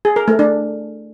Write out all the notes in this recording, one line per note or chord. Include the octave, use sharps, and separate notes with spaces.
G#4
A#4
A3
D4